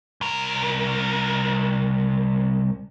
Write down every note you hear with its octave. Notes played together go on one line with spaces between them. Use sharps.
C2 A#4